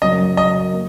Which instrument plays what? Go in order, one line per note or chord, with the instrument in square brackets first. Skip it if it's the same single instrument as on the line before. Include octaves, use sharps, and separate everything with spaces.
[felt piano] F#1 F#2 C#3 F#3 [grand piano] D#5
[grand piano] D#5
[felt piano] A#3